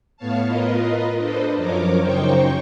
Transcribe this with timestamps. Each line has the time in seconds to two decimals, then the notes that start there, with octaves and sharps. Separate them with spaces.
0.17 A2 B3 C#5 F5 A5
0.46 F4 A#4 B4 D#5
1.17 D4 A4 B4 C5 D#5
1.56 F#2 F3 A#4 C#5 D6
1.99 F#2 C#3 D#4 C5 G5 C#6